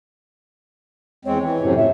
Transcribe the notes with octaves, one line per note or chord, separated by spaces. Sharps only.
E2 G#3 C4 C#5
E3
F#2 A2 C3
A2 E5